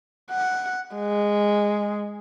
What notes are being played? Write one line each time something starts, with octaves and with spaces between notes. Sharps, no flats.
F#5
G#3